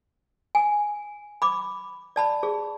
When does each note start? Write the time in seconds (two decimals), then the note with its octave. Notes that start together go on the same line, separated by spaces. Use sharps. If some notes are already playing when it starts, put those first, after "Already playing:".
0.55 G#5
1.42 B5 D6
2.16 D5 A5 B5
2.43 G#4